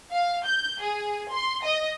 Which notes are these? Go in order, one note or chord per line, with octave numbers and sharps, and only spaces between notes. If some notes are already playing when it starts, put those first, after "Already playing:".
F5
G6
G#4
C6
D#5